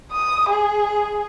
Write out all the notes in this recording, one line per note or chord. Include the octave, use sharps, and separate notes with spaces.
D#6
G#4